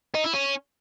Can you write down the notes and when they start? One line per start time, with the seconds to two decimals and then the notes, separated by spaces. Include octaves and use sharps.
0.15 D#4
0.24 E4
0.33 C#4